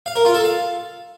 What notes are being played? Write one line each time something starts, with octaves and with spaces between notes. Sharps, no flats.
F5
A#4
F4
A4
F5